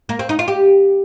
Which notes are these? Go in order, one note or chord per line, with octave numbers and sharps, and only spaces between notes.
A#3
C4
D#4
F4
G4